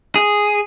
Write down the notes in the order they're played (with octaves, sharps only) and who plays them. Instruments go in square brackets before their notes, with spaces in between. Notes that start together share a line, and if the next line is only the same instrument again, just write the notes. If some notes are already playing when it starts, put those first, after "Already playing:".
[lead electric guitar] G#4